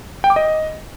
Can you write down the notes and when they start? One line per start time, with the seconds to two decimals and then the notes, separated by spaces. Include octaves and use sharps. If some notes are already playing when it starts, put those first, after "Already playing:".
0.24 G5
0.30 D6
0.36 D#5